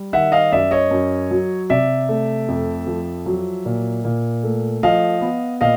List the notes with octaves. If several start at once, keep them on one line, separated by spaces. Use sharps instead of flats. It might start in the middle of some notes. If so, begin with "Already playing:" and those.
Already playing: G3
D#3 E5 F#5
D#5 F5
F#2 D5 E5
C#5 D#5
F#2
F#3
C3 D5 E5
A3
F2
F3
F#3
A#2
A#2
A3
F3 D#5 F5
B3
A#2 D#5 F5